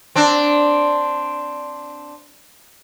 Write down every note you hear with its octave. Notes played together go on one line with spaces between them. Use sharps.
C4 D4